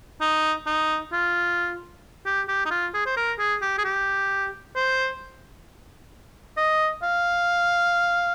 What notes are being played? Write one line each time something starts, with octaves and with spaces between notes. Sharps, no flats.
D#4
D#4
F4
G4
G4
D#4
F4
G#4
C5
A#4
G#4
G4
G#4
G4
C5
D#5
F5